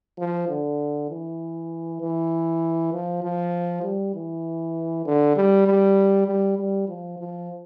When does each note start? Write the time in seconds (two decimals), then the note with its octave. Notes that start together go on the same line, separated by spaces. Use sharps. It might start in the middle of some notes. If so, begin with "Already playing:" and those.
0.18 F3
0.49 D3
1.10 E3
2.01 E3
2.92 F3
3.23 F3
3.83 G3
4.14 E3
5.05 D3
5.36 G3
5.66 G3
6.26 G3
6.57 G3
6.88 F3
7.18 F3